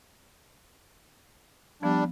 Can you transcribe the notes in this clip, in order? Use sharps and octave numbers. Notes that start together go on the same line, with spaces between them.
F3 G3 B3 D4